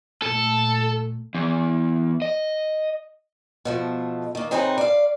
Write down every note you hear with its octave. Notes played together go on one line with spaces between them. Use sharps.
A#2 A3 A4
E2
D#5
B2 F3 A3
D#3 A#3
C3 C4 D#4 G#4 B4 C#5
D5 F5